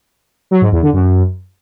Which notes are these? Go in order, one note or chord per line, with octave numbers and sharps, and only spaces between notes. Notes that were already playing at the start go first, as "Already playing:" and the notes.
F#3
G#2
E2
D3
F#2